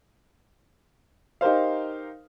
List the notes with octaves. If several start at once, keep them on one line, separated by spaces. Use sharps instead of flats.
D#4 G4 A#4 C5 F5